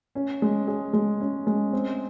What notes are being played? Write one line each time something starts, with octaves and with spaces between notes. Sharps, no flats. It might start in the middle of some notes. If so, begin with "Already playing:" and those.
C#4
G#3
G#4
G#3
C#4
G#3
C4